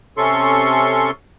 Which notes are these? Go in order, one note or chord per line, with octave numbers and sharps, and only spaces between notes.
C3 C#4 A4 C6 C#6